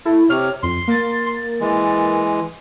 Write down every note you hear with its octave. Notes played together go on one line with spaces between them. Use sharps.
E4 A4
C3 C#5 F6
F2 C6
A#3 A#4 A6
E3 G#3